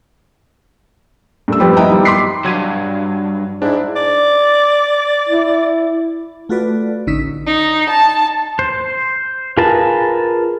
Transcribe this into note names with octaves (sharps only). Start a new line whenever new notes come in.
G2 A3 E6
F3 G3 C4 G4 B4
B3 E4 B4 D#5 G5 A#5
D#3 G3
C6 D6 B6 C7
C2 G2 F#3 G#6 D#7
G#2 D4 E4
D5
E4
A3 F4 F#4 A4 B4 D5
A1 D3 C#4 D#4 E6 B6
D#4
A5
C5
F4 G#4 A#4 B4 A5